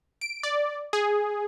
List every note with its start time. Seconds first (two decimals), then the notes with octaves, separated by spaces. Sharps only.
0.21 D7
0.43 D5
0.93 G#4